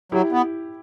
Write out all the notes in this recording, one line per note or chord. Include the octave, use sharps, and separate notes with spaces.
F#3 E4 G4
B3